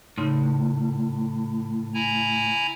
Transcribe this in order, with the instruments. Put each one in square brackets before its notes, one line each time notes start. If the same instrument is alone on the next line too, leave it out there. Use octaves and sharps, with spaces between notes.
[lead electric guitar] A2 [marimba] C#3 D#4 C6
[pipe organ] E4 G#5 A#5